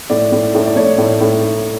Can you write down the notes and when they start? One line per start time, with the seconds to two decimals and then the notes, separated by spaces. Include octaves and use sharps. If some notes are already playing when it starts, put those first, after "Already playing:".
0.10 A2 D5
0.32 A2
0.55 A2
0.66 D5
0.76 A3 C#5
0.98 A2
1.21 A2